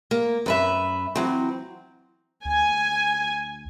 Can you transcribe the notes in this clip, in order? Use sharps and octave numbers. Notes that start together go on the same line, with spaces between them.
A#3
F#2 B4 E5
E3 F#3 C4
D2 G#5